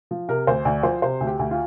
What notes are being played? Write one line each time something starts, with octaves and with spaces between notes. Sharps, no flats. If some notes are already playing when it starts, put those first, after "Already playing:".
F3
C3 A#4
D2 C5
D2 D5
F3 C5
C3 C5
D2
G4
D2
F4